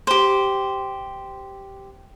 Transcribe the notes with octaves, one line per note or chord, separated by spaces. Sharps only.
G4 C5